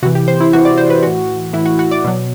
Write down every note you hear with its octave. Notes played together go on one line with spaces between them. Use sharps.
C3 E3 F#4
G4
C5
E4
C3 E3 F#4
D5
C5
B4
A2 E3 F#4
A2 E3 E4
F#4
F#4
D5
B2 F#3